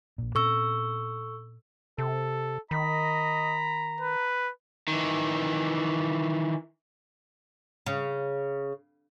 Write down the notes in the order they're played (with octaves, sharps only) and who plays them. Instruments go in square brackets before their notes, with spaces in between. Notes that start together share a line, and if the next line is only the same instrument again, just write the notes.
[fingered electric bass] A#1 A#2
[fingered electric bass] A#2 C4 C#4 [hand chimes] A4 C#6 E6
[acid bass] C3 [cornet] A4
[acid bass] D#3 [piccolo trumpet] D#5 [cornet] A#5 [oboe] B5
[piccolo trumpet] B4
[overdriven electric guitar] D#3 E3
[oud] C#3